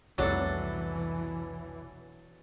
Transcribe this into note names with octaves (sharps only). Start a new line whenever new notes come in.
F1 C2 B2 E3 F#3 D4 A4